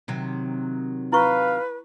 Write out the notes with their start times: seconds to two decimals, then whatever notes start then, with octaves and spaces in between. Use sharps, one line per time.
0.08 C3 D#3 F#3
1.12 E4 B4 F5 C#6